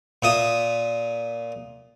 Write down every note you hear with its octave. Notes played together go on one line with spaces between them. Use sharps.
A#2 E5 D#6